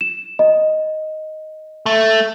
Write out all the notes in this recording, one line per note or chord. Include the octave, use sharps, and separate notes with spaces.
E7
D#5
A3